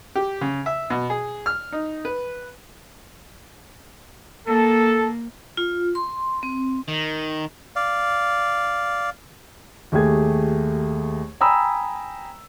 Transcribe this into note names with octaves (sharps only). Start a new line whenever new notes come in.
G4
C#3
E5
B2
G#4
F6
D#4
B4
A#3 A4
F4
C6
C4
D#3
D5 F5
D#2 A3 G4 G#4 G#6
G5 G#5 A#5 B5 D#6 E6